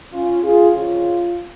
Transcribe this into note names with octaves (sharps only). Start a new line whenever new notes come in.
C#4 F4
F4 G#4
F2 C#3 G#3 C#4 F4